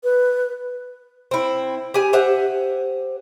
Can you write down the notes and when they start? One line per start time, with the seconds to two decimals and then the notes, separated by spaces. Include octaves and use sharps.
0.04 B4
1.31 C4 E4
1.94 G4 G#4 G#5
2.13 G4 C5 E5 F#5